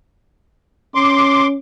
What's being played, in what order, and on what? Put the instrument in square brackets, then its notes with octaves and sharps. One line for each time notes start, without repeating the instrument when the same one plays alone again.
[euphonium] C#4 [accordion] C6 D6